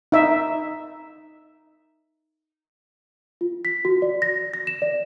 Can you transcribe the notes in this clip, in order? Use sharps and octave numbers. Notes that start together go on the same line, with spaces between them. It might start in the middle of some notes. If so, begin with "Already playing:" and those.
D#4 E5
F4
B6
F#4
D5
A#6
A#6
E7
D5